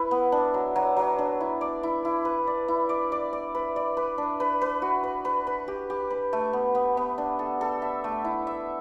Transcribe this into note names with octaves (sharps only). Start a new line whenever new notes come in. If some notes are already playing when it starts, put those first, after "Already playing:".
Already playing: E4 B4
B3
D4
F#3
F#3
F#3
D4
E4
D5
E4
E4
B4
D5
E4
D5
D5
D5
B4
D5
B4
D4
B4
B4
F#4
B4
B4
B4
G4
G4
B4
A3
B3
B3
B3
D4
A4
A4
E5
A3
E4
E5